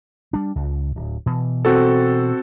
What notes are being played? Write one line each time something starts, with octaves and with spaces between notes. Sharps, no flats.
G3 D4
C#2
D1
B2 E3
C4 F#4 A4